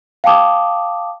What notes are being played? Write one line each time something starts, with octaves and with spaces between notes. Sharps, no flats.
F5 G5 A5 D6 D#6